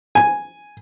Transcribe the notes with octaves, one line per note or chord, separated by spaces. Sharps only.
G#5